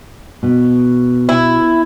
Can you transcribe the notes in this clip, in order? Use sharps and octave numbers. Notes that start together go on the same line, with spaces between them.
B2
E4